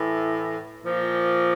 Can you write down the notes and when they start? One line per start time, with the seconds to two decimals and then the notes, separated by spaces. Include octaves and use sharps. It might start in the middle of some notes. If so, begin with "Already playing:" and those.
Already playing: A2 E3
0.84 A#2 F3